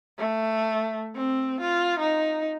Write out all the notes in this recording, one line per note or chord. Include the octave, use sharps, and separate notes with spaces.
A3
C4
F4
D#4